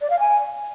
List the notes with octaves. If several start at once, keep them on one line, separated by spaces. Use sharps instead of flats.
D5
F5
G#5